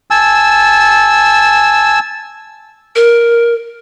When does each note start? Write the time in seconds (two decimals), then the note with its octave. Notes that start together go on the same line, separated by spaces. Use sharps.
0.11 G#5 A5 E6
2.96 A#4